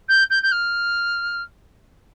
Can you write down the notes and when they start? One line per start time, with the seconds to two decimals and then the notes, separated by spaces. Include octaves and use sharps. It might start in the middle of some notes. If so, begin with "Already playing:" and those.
0.09 G6
0.30 G6
0.43 G6
0.52 F6